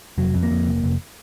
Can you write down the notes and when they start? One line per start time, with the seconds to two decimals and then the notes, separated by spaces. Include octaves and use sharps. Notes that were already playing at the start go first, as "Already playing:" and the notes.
0.18 F1 F#3
0.35 F2
0.43 A#3
0.51 F2
0.66 F1
0.84 F1